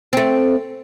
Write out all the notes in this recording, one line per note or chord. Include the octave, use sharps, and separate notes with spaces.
A3 C4